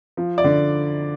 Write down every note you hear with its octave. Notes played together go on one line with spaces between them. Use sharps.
F3
D5
D3